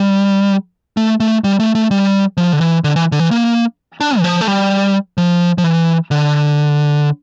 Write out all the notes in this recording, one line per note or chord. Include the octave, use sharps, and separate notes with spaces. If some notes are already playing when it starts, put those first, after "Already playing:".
Already playing: G3
A3
A3
G3
A3
A3
G3
F3
D3
E3
D3
E3
D3
E3
A#3
D4
E3
F3
A3
G3
F3
F3
E3
D3